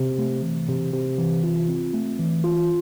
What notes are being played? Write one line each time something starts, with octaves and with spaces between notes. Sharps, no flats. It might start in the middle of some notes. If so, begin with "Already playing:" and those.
Already playing: C3
A3
E3
C3
C3
E3
F4
C4
A3
E3
F4